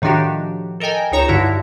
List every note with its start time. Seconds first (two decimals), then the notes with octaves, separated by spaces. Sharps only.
0.02 A2 D#3 F3 D4 F#4 G4
0.80 A4 A#4 D#5 G5 G#5
1.12 C#2 D#4 C#5 A#5 E7
1.28 G2 D3 E4 F#4